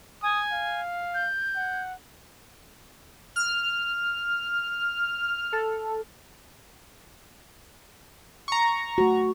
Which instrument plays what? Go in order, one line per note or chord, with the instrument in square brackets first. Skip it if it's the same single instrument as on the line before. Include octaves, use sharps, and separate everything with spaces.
[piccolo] G#5 [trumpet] D#6
[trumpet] F5
[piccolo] G6
[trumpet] F#5
[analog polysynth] F6
A4
[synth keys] A#5 C#6
[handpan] A3 F#4